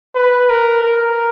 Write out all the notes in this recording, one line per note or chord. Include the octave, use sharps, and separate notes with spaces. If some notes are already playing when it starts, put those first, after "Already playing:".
B4
A#4
A#4